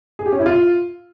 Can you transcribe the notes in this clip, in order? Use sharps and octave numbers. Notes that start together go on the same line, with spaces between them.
G#4
G4
C#4
E4
F4